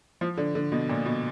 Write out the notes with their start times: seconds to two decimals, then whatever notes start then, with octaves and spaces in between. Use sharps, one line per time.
0.21 F3
0.38 D3
0.55 D3
0.72 B2
0.89 A#2
1.05 B2